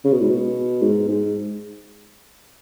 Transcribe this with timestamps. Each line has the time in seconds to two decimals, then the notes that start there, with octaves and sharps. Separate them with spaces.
0.04 C#3
0.13 B2
0.21 G#2
0.29 B2
0.82 G#2
1.08 G#2